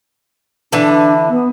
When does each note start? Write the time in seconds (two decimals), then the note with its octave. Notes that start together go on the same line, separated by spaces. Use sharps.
0.72 D3 E3 D4
1.29 B3